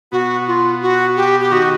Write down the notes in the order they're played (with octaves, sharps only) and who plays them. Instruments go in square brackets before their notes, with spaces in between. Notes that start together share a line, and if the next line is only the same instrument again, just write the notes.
[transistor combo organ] B2 B3 [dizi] F#4
[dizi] F4
F#4
G4
G4
[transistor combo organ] D#3 D#4 [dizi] F#4